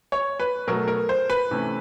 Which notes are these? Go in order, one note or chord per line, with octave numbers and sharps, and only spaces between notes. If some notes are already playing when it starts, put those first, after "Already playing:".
C#5
B4
B2 F#3 A3 A#4
A#4
C5
B4
C3 E3 A3 C#4